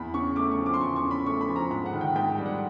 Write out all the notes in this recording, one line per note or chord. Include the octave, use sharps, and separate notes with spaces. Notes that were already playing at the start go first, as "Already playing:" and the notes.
Already playing: E2 B5
C#3 C#6
A3 D6
C#6
F3
D6
C6
E2 C#6
C#6
C#3
B5
A3 C#6
B5
F3
A#5
G#2 B5
F#5
D#3
G5
G#2 G5
G3
F#5